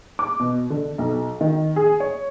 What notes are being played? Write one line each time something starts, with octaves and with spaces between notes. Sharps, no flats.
D6
B2
D3
B1
D#3
G#4
C#5